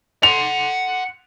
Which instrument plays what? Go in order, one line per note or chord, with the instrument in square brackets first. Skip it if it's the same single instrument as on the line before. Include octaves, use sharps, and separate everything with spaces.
[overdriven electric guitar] F#5 C6 [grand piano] F7